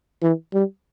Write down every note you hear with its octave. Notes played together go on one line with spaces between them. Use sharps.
E3
G3